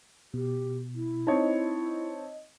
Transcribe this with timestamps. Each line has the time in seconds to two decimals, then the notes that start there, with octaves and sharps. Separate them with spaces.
0.34 B2 G4
0.95 E4
1.27 C4 D#4 C#5 D#5 A5